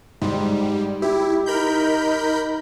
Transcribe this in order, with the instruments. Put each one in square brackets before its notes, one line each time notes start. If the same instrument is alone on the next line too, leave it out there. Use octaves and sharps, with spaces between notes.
[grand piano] G#2 [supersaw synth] G3
[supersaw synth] E4 [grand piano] G4
[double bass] D#4 [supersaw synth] A#4 B5 G6